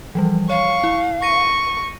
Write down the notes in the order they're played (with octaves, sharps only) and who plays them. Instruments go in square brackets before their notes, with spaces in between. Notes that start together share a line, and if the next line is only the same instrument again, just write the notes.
[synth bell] E3 F3 G3
[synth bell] C#5 [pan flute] F5 [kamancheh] C#6
[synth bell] E4
[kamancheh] C#6 [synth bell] A#6 D#7